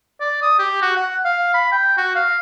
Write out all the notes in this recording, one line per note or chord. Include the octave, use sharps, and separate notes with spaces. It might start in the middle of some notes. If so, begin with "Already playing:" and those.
D5
D#6
G4
F#4
F#5
F5
B5
G5
F#4
F5